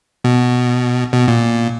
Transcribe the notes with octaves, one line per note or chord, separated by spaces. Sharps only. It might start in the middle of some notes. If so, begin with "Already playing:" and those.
B2
B2
A#2